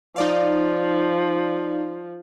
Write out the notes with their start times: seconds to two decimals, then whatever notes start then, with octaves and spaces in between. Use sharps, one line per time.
0.16 F3 D#4 D5 F5